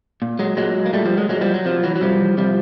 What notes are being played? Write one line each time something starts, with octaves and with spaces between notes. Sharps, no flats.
A#2
F#3 G#3
A#2 F#3 G#3
A#3
A#2 G3 A3
F3 G3
F#3 G#3
A#2 F#3 G#3
F3 G3
F#3
C3 F3
E3 F#3
F#3
C3 F3 G3
E3
C3 F3 G3